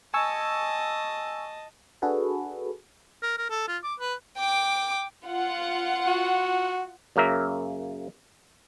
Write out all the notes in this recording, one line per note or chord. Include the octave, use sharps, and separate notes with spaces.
D#5 G#5 A5 C#6 E6
D4 F#4 G#4 A4 B4
A#4
A#4
A4
F4
D6
B4
G5 D6
F4 F#5
F#4
F#2 C#3 A#3 A#4 E5